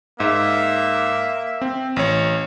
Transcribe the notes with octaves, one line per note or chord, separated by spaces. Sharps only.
G#2 A#3 E5
C4
A1 C#5